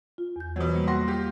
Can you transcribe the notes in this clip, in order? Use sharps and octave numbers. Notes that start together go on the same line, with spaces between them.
F4
E2 G6
B2 E3 F#3 C5
G3 A#3
F#4 C6 A#6
F4 G4